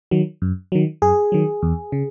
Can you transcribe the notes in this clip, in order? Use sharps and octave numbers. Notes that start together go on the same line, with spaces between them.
D#3 F#3
F#2
D#3 F#3
F#2 G#4
D#3 F#3
E2
C#3